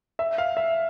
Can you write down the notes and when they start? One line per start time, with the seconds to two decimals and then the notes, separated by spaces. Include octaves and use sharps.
0.19 E5
0.38 F5
0.57 E5